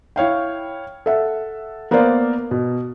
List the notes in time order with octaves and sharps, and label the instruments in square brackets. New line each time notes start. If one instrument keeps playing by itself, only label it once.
[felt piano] E4 C#5 F5 G5
A4 E5 F#5
A#3 B3 A#4 C5 D5 F5
B2